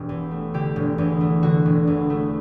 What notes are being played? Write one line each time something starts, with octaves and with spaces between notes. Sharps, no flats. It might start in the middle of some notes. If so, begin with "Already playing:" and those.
Already playing: E1 G4
E2
A3
D3 G4
E1
E2
A3
D3 F#4
E1
E2
A3